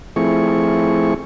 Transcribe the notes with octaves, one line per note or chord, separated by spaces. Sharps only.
F3 A3 C4 E4 G#4 C#6